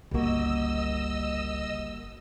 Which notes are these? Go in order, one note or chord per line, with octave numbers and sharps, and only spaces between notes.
G1 C#2 C#3 G3 A#3 F#4 D#5 E6